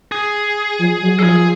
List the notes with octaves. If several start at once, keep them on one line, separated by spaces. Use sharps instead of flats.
G#4
F3
F#3
F#3 A4
F3 G#4